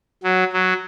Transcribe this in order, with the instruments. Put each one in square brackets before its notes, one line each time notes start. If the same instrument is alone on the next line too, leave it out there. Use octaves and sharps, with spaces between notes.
[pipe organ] F#3
F#3